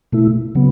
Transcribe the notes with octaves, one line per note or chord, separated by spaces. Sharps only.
B2 A3 E4
C#3 F#3 B3